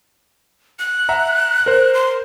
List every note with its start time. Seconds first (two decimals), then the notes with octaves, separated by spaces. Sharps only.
0.79 F#6
1.09 E5 F#5 A#5
1.66 A#4 C5
1.94 C6